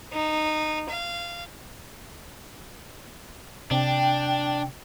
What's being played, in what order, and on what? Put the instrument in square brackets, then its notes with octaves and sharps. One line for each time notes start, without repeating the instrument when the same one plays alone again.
[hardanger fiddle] D#4
F5
[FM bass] C3 [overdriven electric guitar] D4 [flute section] G5